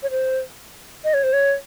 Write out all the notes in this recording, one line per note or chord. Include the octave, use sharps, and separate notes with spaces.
C#5
C5
D#5
C#5
C5
C#5